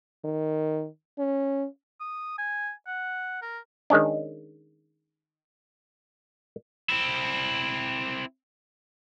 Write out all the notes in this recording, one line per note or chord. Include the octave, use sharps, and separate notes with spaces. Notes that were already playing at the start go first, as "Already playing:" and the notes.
D#3
C#4
D#6
G#5
F#5
A#4
D#3 G#3 C#4 D4
C4 E4